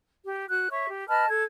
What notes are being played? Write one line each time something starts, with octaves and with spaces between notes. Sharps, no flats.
G4
F#4 F#6
C#5 E5 C#6
G4
B4 D#5 A5 F6
A4 G#6